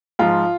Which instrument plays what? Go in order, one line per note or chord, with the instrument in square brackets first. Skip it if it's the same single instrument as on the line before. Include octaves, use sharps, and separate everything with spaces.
[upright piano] G#2 F3 F4